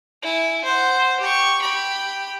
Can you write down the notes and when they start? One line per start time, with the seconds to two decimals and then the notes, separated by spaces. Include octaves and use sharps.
0.22 E4 G#5
0.65 C5 F#5
1.20 G4 C#6
1.61 G4 B5